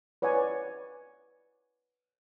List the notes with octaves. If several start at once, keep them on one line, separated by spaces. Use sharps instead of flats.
B4 C#5 D5 F#5 G#5